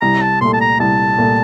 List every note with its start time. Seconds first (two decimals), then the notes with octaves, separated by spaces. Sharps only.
0.02 C2 A#5
0.21 A5
0.41 A#2 A3 C6
0.53 A5
0.61 A#5
0.80 C2 A5
1.18 A#2 A3